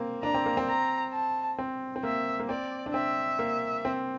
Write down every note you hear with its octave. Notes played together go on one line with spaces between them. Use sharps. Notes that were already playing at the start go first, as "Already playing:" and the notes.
Already playing: A#3 C4
D4 A#5
C4
A#3
C4
A#5
A5
C4
C4
A#3 E5
A#3
C4 D5
D4
C4 E5
A#3
C4